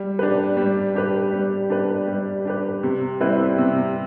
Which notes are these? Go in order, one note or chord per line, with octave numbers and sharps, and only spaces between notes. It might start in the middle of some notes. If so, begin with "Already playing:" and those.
Already playing: G3
D4 G4 B4
G3
D4 G4 B4
G3
D4 G4 B4
G3
D4 G4 B4
C3
G3 C4 E4 B4
C3